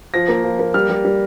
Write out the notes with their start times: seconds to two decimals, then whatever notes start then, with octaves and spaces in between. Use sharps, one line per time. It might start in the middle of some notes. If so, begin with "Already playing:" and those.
0.14 F3 A#6
0.29 A#3
0.44 F3
0.59 A#3
0.74 G3 F6
0.89 G3
1.05 G3